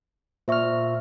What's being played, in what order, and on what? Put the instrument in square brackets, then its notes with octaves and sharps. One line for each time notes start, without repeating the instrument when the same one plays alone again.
[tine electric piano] A#2 F6 [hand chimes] C5 E5 C#6